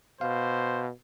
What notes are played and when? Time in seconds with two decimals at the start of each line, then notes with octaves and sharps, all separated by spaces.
0.21 B2 C5 F5